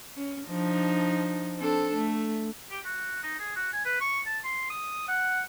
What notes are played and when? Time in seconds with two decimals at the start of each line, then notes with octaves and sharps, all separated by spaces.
0.17 C#4
0.49 F3 D4 D#4
1.58 C4 D4 A4
1.95 A3
2.71 G4
2.85 F#4
3.23 D#4
3.39 G#4
3.55 F#4
3.73 G#5
3.85 B4
4.01 C#6
4.26 A5
4.44 C6
4.70 D#6
5.08 F#5